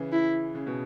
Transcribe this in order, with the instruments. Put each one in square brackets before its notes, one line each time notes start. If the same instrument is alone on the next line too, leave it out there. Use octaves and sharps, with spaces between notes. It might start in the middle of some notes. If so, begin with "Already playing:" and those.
Already playing: [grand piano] C#3 E3
[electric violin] E4
[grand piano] C#3
B2